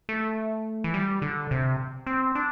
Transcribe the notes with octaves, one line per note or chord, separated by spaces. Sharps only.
A3
E3
G3
D3
C3
C4
D4